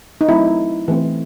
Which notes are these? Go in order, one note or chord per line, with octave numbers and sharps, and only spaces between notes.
D#4
F#3 A3 C4 E4
E3 A3 C4